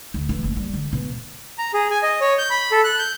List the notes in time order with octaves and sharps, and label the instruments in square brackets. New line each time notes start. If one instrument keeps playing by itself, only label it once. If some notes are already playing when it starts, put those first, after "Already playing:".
[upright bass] D2
E3
F#1
G3
D3
B2
[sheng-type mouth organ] A#5
G#4
G#5
D#5
C#5
G6
B5
A4
F#6
G6